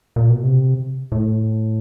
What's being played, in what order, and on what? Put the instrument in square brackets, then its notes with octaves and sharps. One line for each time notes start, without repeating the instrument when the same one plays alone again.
[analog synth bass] A#2
B2
C3
A2